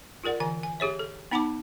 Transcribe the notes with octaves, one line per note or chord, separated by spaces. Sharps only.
F4 G#4 A#4 D5 F#5
D3 E3 G#5
G#5
G4 G#4 C#5 E5
A4
B3 D#4 F#5 A5 B5 D6